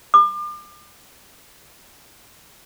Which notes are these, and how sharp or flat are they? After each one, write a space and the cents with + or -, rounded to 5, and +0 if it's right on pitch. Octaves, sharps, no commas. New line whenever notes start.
D6 +35